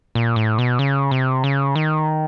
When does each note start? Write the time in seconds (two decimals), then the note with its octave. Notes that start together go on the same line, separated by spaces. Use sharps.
0.15 A#2
0.36 A2
0.58 B2
0.79 C#3
1.11 C3
1.44 C#3
1.76 D#3